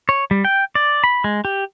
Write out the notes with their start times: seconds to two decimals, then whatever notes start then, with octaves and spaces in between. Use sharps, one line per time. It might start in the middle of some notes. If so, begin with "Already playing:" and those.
0.09 C#5
0.31 G3
0.45 G5
0.75 D5
1.04 B5
1.24 G#3
1.45 G4